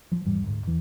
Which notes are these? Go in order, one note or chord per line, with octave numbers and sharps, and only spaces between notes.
F3
E1 G#2 E3 G3
D2 G#2
E2 E3